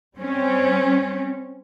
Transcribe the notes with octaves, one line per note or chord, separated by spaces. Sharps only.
G3 C4 C#4